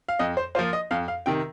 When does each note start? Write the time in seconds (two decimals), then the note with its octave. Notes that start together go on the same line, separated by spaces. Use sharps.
0.08 F5
0.19 F2 D#5
0.37 C5
0.55 F3 A#3 F4 C5
0.73 D#5
0.91 F2 F5
1.08 F5
1.26 C3 D#3 G5